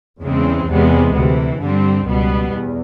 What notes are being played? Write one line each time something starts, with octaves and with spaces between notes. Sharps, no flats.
E2 C#3 E3 G#3 C4
E2 C3 E3 G#3 B3
D2 C3 E3
G2 D3 G3 C4
C#2 B2 G3 B3
E2